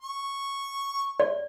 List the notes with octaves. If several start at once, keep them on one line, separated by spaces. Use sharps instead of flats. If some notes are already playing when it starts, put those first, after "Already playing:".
C#6
D5